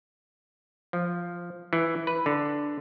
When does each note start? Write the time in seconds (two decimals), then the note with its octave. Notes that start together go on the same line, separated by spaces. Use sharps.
0.93 F3
1.73 E3
2.07 B4
2.26 D3